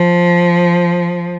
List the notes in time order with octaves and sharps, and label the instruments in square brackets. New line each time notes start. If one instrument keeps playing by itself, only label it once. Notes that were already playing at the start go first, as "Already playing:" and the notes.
Already playing: [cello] F3